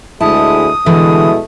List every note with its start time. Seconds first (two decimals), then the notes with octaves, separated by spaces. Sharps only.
0.21 D2 G#3 E4 A5 D#6
0.86 B2 D3 E3 G#3 A3 E4